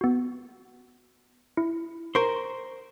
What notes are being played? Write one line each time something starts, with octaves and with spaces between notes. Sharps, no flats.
B3 F#4
E4
A#4 C5 C#6 G6